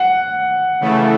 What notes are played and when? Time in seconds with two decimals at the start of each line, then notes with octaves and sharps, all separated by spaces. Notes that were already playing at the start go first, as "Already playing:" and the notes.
Already playing: F#5
0.80 C#3 E3 A3